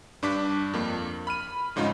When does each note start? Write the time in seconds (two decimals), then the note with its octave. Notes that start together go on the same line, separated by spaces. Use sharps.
0.23 G2 D4 D6 B6
0.74 F2 A#3
1.27 B5 F6 D#7
1.76 F2 G#2 C#3 D#4 F4